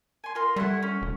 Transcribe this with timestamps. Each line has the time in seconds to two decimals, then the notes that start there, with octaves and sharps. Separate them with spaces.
0.24 G#5 C6
0.35 F4 A#4 C6
0.56 G3 A3 E4 F#5
0.83 C#4
1.02 E1